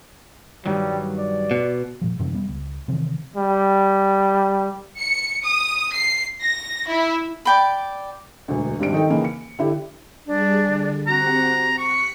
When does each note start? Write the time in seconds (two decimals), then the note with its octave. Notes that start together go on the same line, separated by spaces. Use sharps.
0.66 G2 D#3 F#3 G3
1.19 D5
1.51 B2
2.01 A#2 F3
2.19 F#2 C3 E3 C#4
2.34 G3 B3
2.49 C#2
2.88 C3 D#3 E3 C4
3.36 G3
4.99 C#7
5.44 D#6
5.94 C7
6.41 A#6
6.89 E4
7.45 D5 G5 B5
8.48 E1 D2
8.80 G#1 G3 D4 D7
8.93 D#3 D#4 A4 G5
9.10 C#3 E3 A#3
9.24 C#7
9.59 D3 E4 G4
10.26 G3 D4 G#4
10.62 D3
11.07 C4 F#4 G4 F#5 A#5
11.78 C#6 F#6 B6 C#7